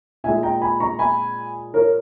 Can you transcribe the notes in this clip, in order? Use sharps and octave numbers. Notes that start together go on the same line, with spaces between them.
A#2 G#3 E5 G#5
G5 A#5
G#5 B5
A#5 C#6
G#5 B5
A#4 C#5